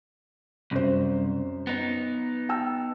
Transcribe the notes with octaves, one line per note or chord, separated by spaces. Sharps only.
C2 F#2 C5
B3 D#4
G5 A5 E6